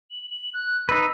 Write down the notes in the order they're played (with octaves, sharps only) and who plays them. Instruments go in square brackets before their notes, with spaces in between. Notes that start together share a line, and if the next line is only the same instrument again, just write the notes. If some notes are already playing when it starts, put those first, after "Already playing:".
[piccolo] F#7
F#7
F#6
[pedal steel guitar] D#4 B4 [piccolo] E6